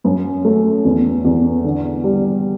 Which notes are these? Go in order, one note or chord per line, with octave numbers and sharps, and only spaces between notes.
F#2
A3
E2
E2
D3
G3